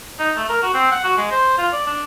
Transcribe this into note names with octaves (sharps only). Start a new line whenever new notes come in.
D#4
A3
A#4
F#4
C4
F#5
F#4
G#3
C5
F4
D5
D4